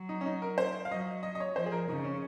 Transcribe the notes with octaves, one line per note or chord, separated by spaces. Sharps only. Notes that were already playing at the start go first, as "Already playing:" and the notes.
Already playing: F#3
D#4
C#4
D#4
A#4
C5
F5
F#3 D#5
D#5
D#5
C#5
F3 C5
G#4
A#4
C#3 D#4
C#4